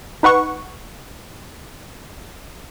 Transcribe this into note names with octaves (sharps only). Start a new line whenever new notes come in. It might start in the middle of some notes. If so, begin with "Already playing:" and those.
D#4 B4 F#5 C#6